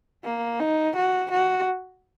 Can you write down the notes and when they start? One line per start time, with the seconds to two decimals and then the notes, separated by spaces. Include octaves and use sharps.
0.24 A#3
0.60 D#4
0.96 F#4
1.31 F#4